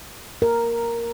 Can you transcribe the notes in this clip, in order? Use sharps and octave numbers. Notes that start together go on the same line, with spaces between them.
A#4